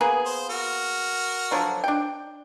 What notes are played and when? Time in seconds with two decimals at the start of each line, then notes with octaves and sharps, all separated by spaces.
0.01 A#3 B3 G#4
0.26 C5
0.49 F#4 A#4
1.51 D3 F3 F#3
1.84 D4 G5